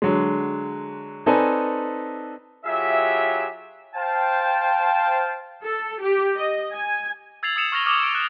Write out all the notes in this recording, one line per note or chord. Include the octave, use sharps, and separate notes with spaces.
D3 F#3 G#3
C4 D#4 A4 B4 D5 G#5
F#3 F4 G4 G#4 E5
C5 F5 G5 A5
A4
G4
D#5
G#5
E6 G#6 A6 C7 F7 F#7
D#6 E6 G#6 C#7 E7 F7
C#6 F6 A6 A#6 F7 G7
D6 D#6 F6 F#7
D7 E7
F#6